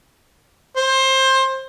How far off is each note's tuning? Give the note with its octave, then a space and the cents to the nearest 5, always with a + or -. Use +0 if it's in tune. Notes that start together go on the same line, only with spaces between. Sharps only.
C5 +20